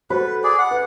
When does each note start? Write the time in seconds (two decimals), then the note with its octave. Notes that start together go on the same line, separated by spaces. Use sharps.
0.10 F#4 A4 B4 C5 B5
0.44 G#4 D5
0.59 F#5
0.71 B4